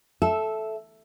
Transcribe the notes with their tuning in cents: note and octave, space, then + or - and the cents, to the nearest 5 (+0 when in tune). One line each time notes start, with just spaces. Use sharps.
A4 -10 E5 +0